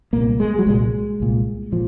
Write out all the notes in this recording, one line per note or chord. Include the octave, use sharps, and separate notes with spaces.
C2 A#2 A#3
G#3
F#3
C2 A#2 G#3
C2 A#2
A#2 F3